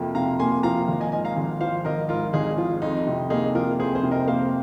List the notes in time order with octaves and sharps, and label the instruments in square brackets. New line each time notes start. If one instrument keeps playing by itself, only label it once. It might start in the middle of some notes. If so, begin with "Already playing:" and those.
Already playing: [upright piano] F2 C3 F3 A#3
[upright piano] C3 [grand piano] F5 A#5
[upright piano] A#3 [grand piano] G#5 C6
[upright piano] F3 [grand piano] F5 A#5
[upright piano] G#1
[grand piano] D#5 G#5
[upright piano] G#2 [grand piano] D#5 G#5
[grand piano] F5 A#5
[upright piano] G#1
[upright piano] F3 [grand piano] C5 F5
[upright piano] G#1 [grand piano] A#4 D#5
[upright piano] G#2 [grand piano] F4 A#4
[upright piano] G#1 [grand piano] D#4 G#4
[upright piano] F3 [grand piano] F4
[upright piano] F2 [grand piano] D#4
[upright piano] C3
[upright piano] A#3 [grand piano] D#4 G#4
[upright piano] F3 [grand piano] F4 A#4
[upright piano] F2 [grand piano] G#4 C5
[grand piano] G#4 C5
[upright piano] C3
[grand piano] A#4 D#5
[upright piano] A#3 [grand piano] C5 F5